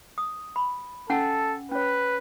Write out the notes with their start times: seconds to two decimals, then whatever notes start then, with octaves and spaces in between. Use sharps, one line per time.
0.18 D#6
0.56 B5
1.10 C#4 A4 F#5 G#5
1.72 C#4 B4 C#5